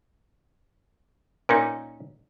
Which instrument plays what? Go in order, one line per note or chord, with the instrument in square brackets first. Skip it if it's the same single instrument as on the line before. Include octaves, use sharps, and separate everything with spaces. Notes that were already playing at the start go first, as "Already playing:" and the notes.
[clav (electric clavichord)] A#2 C#4 D#4 [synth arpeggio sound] A#4 C#7